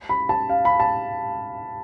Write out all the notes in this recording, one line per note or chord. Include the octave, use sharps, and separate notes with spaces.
B5
A5
F5
B5
A5